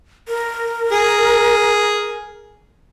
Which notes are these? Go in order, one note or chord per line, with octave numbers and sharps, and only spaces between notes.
A#4
G#4